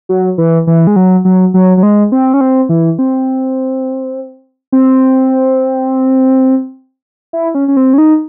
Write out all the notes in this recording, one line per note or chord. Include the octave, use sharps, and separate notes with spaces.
F#3
E3
E3
G#3
F#3
F#3
F#3
F#3
G#3
C4
C#4
C4
E3
C4
C4
E4
C#4
C#4
C4
C#4
D#4